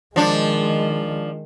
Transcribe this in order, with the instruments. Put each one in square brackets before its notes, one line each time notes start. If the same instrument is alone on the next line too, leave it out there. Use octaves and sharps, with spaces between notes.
[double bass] D#3 G#3 [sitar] F3 D4